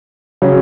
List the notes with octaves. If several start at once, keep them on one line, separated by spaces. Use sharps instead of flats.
C#3 F#3 C#4